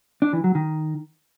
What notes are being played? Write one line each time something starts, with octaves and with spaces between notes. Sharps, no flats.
D4
E3
F#3
D#3